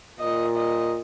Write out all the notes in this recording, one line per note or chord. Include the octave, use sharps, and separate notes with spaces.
A#2 D#5
D#5